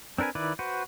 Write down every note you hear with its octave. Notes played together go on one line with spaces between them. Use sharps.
C4 D4 A#4 B4 G#5
D#3 E4 B4 D5
F#4 B4 C5